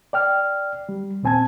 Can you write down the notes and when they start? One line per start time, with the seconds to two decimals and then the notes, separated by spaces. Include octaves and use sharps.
0.13 D5 G5 F6
0.89 G3
1.23 D#2 A#2 C4 G#5 A5 G#6